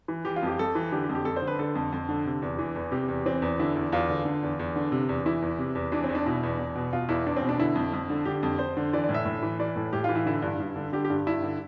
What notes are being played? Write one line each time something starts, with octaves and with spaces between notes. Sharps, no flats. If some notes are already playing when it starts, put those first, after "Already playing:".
E3
E3 G4
F4
F2 G4
F2 A4
E3
D3 G4
G4
F2
G4
F2 A4
C5
D3
B4
D3 A4
F2
F2
D3
C3
E2
E3
E2
C3 G4
E2
E3 C4
E2
D3 E4
E2
E2 F4
D3
D3
E2
E2
D3
C3
E2
E3 E4
E2
C3
E2
E3 D4
C4
E2
D4
B2 E4
E2
E2
B2
B2 F4
E2 E4
E2 D4
C4
B2
D4
D3 E4
F2
F2
D3
D3 G4
F2
F2 C5
D3
E3 D5
D5
A2
E5
A2
E3
E3 D5
A2
A2 G4
E3 F4
E4
D3 E4
G2
G2
D3
D3 G4
G4
G2
G2 E4
D3